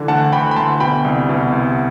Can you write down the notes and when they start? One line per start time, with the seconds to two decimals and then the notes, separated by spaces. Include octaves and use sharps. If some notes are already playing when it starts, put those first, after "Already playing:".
Already playing: D3 E3
0.08 D2 F#5 A5
0.32 D2 G5 B5
0.51 B5
0.56 D2 A5 C6
0.80 B2 G5 B5
1.05 C2
1.29 B2
1.52 C2